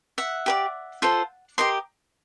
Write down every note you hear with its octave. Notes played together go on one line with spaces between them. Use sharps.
E5 F#5
G4 B4 D5
F4 A4 C5
G4 A#4 D#5 C6